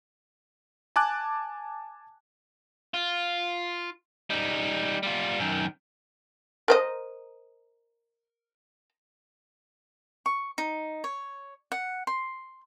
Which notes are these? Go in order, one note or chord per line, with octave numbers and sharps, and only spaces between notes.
G#5 A5 D6 F#6
F4
G3 D#4
G3 F4
F#2 D#3
A#4 C5 D#5
C#6
D#4
C#5
F#5
C6